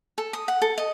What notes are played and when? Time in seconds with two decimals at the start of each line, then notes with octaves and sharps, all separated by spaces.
0.18 A4
0.33 D#6
0.48 F#5
0.62 A4
0.78 D#5